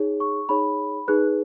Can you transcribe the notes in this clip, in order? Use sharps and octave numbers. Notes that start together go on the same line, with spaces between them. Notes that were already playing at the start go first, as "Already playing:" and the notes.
Already playing: D#4 G#4 C#5
C#6
D#4 G#4 C#5 B5
D#4 G#4 B4 F#6